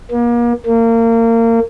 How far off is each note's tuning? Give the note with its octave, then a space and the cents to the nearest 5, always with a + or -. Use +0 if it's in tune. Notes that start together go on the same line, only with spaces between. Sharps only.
A#3 +35
A#3 -30